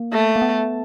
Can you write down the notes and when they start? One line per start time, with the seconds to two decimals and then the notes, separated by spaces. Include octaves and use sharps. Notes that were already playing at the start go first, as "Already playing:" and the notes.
Already playing: A#3
0.12 A3
0.36 A#3
0.42 B3